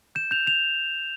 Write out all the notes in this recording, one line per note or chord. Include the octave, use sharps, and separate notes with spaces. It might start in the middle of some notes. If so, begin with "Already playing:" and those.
G6 E7
G6 F7
G6 F7